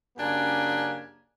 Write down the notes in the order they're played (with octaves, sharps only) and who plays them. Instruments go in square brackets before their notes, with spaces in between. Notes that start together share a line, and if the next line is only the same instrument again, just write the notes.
[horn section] F#2 C#3 A#3 D4 G4 G#5